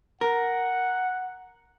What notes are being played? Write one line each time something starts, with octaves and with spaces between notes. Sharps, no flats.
A#4 F#5